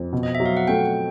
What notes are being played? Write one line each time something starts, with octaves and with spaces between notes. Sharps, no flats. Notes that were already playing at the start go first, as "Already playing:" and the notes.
Already playing: F2
B2
D#5
E5
F#3
F5
F#5
A3 G5